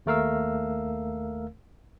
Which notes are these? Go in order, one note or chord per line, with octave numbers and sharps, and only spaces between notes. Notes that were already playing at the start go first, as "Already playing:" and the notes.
D#2 A3 A#4 F5 E6